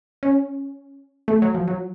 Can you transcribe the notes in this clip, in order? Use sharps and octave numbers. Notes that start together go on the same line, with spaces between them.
C#4
A3
F#3
F3
F#3